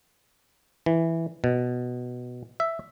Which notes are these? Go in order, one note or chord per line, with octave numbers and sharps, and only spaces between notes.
E3
B2
E5